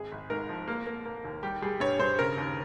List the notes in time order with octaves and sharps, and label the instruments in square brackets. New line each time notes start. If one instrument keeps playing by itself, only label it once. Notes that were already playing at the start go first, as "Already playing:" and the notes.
Already playing: [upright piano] G#1 G#4
G#1
G#2 A#4
F3
A#3 A#4
A#3
A#3
D#2
G3 G4
G3 G#4
G2 C#5
G2 C5
C#3 A#4
D#2